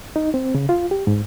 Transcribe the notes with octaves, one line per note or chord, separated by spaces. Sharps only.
D#4
C4
C#3
F4
G4
G#2